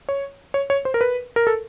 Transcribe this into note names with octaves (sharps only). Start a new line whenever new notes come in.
C#5
C#5
C#5
C5
A#4
B4
A#4
A4